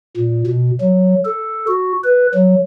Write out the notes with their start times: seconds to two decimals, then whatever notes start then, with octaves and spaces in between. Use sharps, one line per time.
0.17 A#2
0.47 B2
0.81 F#3
1.25 A4
1.68 F#4
2.04 B4
2.34 F#3